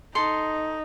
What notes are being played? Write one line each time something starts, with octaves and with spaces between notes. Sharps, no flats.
D#4 A4 C6